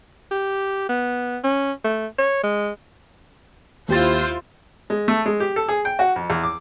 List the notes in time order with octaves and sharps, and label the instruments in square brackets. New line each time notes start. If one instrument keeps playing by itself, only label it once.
[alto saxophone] G4
B3
C#4
A3
C#5
G#3
[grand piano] D#2 G4 A6 [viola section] E4 F4 C5
[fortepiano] G#3
A3
G#3
G4
A4
G#4
G5
F#4
F2
E2
D6